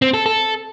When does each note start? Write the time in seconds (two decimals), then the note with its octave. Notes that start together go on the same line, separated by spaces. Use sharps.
0.02 C4
0.14 A4
0.26 A4